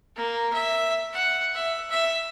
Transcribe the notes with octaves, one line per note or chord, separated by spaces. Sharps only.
A#3
E5
F#5
E5
E5